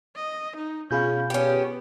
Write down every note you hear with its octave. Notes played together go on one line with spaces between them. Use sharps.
D#5
D#4
B2 C#4 F4 G#4 F5 B5 G6
B3 C#4 G4